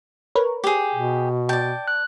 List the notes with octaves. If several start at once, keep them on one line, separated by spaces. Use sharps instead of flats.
A#4 B4 C#5
G4 G#4
B2
D5 G5 A5 G6
F#6